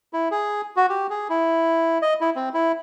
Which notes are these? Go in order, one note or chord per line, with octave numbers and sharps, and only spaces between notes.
E4
G#4
F#4
G4
G#4
E4
D#5
E4
C4
E4